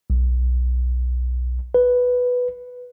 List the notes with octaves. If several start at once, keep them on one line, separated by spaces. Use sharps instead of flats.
B1
B4